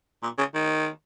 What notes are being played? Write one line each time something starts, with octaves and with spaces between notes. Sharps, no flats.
A#2
C#3
D#3